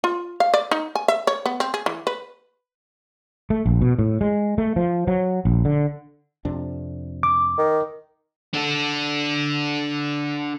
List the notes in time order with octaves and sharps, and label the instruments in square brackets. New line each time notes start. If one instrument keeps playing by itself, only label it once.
[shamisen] F4
F5
D5
D#4
G#5
E5
C#5
B3
C4
G#4
E3
B4
[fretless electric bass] A3
A#1
B2
A2
G#3
A3
F3
F#3
A#1
D3
F2 C3 D4
[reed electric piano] D6
[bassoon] D#3
[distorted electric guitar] D4 A4